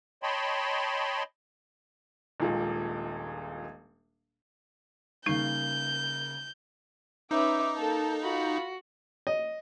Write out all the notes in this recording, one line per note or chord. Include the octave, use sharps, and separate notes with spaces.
C#5 D#5 G5 A5 B5 C6
D#1 A#1 A#2 G#3
C#3 G3 A#3 D#4 G6 C7
C#4 D#4 B4 E5 D6
A#3 A4 A5
F4 F#4 B5
D#5